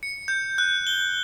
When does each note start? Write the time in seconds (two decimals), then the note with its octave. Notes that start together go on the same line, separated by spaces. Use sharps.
0.03 C#7
0.28 G6
0.58 F#6
0.87 G7